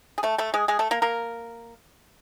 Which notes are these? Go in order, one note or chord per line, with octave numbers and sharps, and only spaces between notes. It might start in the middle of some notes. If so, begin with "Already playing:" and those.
G#4
A3 A4
A3 A4
G#3 G#4
G#3 G#4
A3 A4
A#3 A#4
A#3 A#4